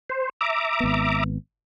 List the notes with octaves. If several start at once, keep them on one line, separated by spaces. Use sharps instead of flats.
C5
E5 A#5 D6
G#1 B3